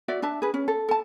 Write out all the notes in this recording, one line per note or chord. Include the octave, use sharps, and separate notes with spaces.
F#4 D5 E5
D4 E5 A5
G#4 B4
C#4
A4
A4 A5